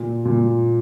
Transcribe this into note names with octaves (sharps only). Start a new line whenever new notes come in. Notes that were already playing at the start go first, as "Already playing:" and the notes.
Already playing: A#2
A#2